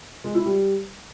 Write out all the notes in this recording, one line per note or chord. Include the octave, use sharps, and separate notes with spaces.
G#3
E4
G3